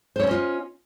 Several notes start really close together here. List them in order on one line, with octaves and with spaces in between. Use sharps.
C5 C#5 C#4 D#5 F4